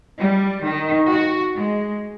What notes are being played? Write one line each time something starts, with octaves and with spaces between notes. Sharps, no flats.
G3
D#3
F#4
G#3